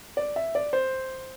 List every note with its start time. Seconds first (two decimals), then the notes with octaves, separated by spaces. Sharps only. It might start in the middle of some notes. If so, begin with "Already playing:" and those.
0.17 D5
0.36 E5
0.55 D5
0.73 C5